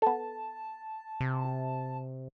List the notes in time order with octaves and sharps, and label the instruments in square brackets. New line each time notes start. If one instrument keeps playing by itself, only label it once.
[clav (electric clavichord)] B3 A4 [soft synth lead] A5
[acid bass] C3